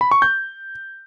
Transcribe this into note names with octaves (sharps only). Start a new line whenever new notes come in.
B5
C#6
G6